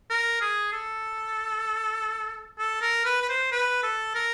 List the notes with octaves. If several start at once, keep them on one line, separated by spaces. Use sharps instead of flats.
A#4
G#4
A4
A4
A#4
B4
B4
C5
B4
A4
A#4